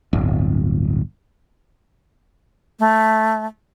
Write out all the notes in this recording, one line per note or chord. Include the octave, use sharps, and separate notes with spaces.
D1 G1
A3